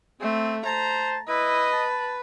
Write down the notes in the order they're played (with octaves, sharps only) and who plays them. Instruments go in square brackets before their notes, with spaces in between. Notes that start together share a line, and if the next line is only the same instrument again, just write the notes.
[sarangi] A3 [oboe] C4
[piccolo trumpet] C5 [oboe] A5 [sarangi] A#5
[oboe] E4 [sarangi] B4 [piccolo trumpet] D#5
[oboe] A5